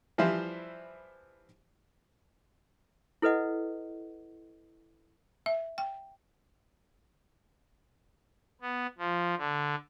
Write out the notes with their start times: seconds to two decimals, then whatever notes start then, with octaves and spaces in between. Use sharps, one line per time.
0.18 E3 F3 G3 E4 C5
3.22 E4 A4 B4 D#5 F#5
5.46 E5
5.78 G5
8.61 B3
8.98 F3
9.38 D3